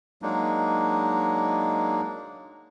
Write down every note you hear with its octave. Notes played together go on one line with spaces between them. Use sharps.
F#3 G#3 A#3 D4 D#4